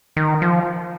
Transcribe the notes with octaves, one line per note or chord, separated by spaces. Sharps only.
D#3
F3